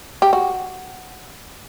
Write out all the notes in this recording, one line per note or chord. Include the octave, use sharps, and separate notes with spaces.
G4
F#4